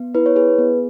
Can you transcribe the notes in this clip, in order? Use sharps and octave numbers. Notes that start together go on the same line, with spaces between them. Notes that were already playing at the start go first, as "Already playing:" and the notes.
Already playing: B3
E4 B4
C#5
G#4 B4
B3